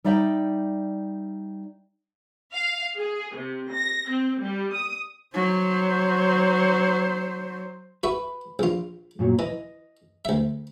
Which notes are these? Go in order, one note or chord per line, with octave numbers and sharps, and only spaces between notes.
G3 D#4 D5 E5 G5
F5
G#4
C3
A#6
C4
G3
D#6
F#3 C5
F#4 B4 E5
A#1 F4
F#2 A#2 F#3
E3 D#5
D2 E5